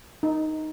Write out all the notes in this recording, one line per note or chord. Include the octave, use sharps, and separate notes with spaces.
D#4